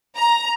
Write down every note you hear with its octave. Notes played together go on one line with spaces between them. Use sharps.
A#5